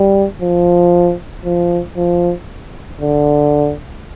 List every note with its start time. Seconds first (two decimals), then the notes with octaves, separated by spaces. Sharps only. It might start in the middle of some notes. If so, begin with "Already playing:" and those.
Already playing: G3
0.41 F3
1.45 F3
1.97 F3
3.01 D3